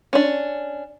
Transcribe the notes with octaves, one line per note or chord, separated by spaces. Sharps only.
C#4 D4